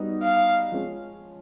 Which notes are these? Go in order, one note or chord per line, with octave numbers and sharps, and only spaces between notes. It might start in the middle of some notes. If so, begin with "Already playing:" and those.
Already playing: G3 B3 D#4 F#4
F5
F3 G#3 C#4